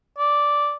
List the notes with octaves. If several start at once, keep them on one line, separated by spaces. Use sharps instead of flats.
D5